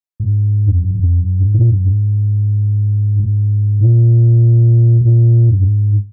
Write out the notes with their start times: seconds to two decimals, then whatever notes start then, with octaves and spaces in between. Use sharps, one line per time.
0.20 G#2
0.67 F2
0.79 F#2
0.91 F#2
0.99 F2
1.19 F#2
1.39 G#2
1.54 A#2
1.70 F#2
1.84 G#2
3.20 G#2
3.80 A#2
5.01 A#2
5.49 F#2
5.60 G#2